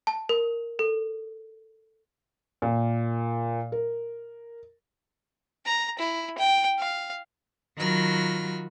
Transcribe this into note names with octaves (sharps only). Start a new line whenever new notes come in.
A5
A#4
A4
A#2
A#4
A#5
E4
G5
F5
D#3 F#3 F4 F#4 B5 F6